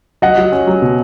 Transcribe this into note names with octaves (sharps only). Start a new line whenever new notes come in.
F#3 D#5 F#5
F#3
C#4
F#3
B2